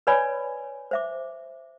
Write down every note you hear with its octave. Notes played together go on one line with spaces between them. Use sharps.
B4 C#5 D5 G#5 B5
C5 E5 D6